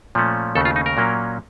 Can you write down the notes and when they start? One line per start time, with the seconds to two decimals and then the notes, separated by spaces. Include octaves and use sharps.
0.15 A#2 F3 A3 C#4
0.55 D#2 C#3 A3 A4
0.65 F4
0.76 D#4
0.86 A#4
0.97 A#2 F#3 A#3 C#4